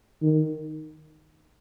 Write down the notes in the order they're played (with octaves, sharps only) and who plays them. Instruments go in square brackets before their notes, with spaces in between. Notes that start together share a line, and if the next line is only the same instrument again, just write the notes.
[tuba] D#3